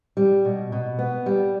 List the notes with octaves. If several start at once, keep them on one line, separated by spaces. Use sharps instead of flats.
G3
B2
B2
B3
G3